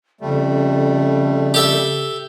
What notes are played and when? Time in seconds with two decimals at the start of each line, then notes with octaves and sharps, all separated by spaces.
0.21 F2 C#3 G3 A3
1.54 G4 A4 E5